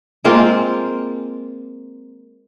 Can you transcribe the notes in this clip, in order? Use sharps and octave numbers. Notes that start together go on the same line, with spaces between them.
G#3 A#3 C4 F4